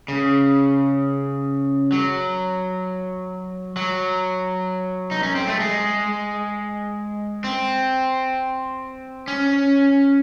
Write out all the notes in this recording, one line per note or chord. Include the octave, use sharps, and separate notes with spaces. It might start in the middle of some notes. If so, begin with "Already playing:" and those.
C#3
F#3
F#3
D#4
C#4
C4
A3
G#3
C4
C#4